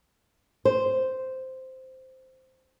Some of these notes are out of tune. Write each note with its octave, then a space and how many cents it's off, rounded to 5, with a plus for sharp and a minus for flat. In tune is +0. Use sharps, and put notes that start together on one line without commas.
C5 -5